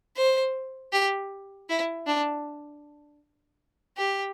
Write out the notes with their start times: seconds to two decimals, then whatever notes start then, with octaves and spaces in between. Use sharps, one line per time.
0.16 C5
0.92 G4
1.69 E4
2.07 D4
3.97 G4